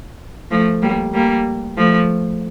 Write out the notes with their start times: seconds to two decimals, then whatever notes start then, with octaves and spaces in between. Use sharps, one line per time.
0.51 F3 A3
0.82 G3 A#3
1.14 G3 A#3
1.77 F3 A3